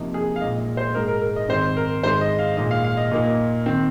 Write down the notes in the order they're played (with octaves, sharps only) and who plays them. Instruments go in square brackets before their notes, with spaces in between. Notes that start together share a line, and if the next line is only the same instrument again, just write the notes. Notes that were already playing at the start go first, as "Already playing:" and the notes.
Already playing: [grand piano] C3 F3 A#3 D#4
G#4
F5
A#2 G#3 D#4 D#5
D#5
C5
G#2 G#3 D#4 A#4
A#4
A#4
D#5
G#2 D#3 C4 D#4 C5
A#4
G#2 D#3 G#3 C5
D#5
F5
A#2 G#3 D#4 D#5
F5
F5
D#5
A#2 A#3 D#4
D#3 C4